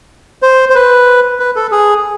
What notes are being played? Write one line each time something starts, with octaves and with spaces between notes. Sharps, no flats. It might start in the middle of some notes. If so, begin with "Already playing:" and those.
C5
C5
B4
B4
A4
G#4